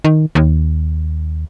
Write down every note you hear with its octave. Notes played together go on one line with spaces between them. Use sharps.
D#3
D#2